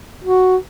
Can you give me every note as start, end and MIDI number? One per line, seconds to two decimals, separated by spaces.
0.24 0.57 66